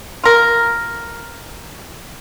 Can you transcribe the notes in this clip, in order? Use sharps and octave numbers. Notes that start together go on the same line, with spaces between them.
F4 A#4